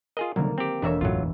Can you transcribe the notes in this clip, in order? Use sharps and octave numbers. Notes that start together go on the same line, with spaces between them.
F4 G#4 A#4 D#5
C2 D3 D#3 F#3 A#3
C4 G4
E1 D4 A#4 C#5 E5
A1 F#2 A2 F#3 F4